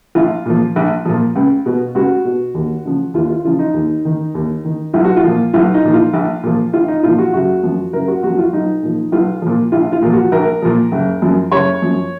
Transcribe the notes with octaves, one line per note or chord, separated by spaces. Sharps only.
A#1 F4
A#2 F3
A#1
A#2 F3
C#2
B2
C#2 F#4
B2
D#2
C#3 F3
D#2 F4
F4
C#3 F3 F4
D#4
D#2
D#3
D#2
D#3
B1 F4
F#4
F4
A#2 F3
B1 F4
D#4
A#2 F3
F4
A#1
A#2 F3
A#1 F4
D#4
A#2 F3 F4
F#4
F#1 F#4
F#2 F3
F#1 A#4
F#4
F#2 F3 F#4
F4
B1 D#4
A#2 F3
B1 F4
A#2 F3
A#1 F4
F4
A#2 F3
F#4
A#1 A#4
A#2 F3
F#1
F#2 F3
F#1 C#5
F#2 F3